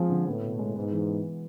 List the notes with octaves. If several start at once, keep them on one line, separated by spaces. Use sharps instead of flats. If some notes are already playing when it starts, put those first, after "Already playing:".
Already playing: F3 G#3 C4 G#4
D3
A2 B3
B2
G#3
G#2 B3
E3
B3